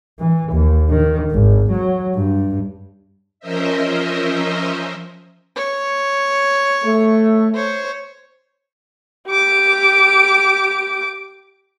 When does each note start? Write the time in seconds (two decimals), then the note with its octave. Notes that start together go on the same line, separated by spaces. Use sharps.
0.19 E3
0.53 D#2
0.89 D#3
1.31 G#1
1.72 F#3
2.16 G2
3.40 F3 C#4 A#4 C5 D#5 E5
5.56 C#5
6.84 A3
7.55 C5 C#5
9.28 G4 D6